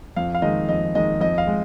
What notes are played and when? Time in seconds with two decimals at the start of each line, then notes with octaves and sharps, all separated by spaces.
0.16 F2 F5
0.35 F5
0.42 D#3 G#3 D#5
0.69 F2 D#5
0.95 D#3 G#3 D#5
1.20 F2 D#5
1.38 F5
1.47 G#3